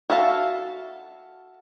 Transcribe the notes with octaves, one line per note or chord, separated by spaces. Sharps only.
F#4 A4 E5 F5 A5